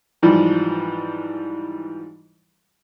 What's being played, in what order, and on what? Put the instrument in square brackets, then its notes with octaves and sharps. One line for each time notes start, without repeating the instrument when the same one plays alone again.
[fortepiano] G#2 E3 F3 G3